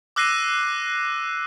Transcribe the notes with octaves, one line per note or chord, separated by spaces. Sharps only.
D6 E6 F#6 A#6 C7 D#7